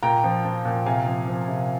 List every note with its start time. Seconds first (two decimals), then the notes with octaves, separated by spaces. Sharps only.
0.03 A#2 G5 A#5
0.24 F3
0.45 F3
0.65 A#2
0.86 C3 F5 G#5
1.06 F3
1.28 F3
1.48 C3